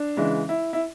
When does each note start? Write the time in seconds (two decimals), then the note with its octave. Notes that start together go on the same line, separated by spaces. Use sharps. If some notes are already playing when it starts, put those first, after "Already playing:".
Already playing: D4
0.17 C#3 E3 G#3
0.49 E4
0.73 E4